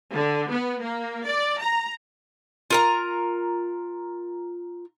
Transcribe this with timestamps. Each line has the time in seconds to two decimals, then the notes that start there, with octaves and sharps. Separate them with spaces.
0.14 D3
0.50 B3
0.82 A#3
1.25 D5
1.61 A#5
2.70 F4 A#4 A#5